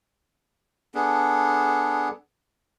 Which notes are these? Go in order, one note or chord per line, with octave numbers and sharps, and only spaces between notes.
B3 D4 G#4 A4